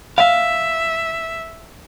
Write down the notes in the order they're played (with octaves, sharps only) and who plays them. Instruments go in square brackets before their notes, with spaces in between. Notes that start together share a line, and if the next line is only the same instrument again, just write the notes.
[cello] E5 [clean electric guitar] F5